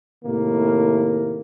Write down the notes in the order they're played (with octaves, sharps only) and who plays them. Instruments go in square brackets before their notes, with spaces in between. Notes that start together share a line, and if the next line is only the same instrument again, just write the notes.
[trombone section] A2 C3 D#3 A#3